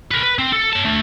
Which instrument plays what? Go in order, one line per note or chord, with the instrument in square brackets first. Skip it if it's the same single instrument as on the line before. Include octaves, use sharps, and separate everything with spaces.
[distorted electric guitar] A#4 B4
B4
C4
A4
C#5 A5
A3 D4